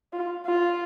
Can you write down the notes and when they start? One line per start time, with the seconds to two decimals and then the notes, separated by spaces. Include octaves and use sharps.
0.13 F4
0.46 F4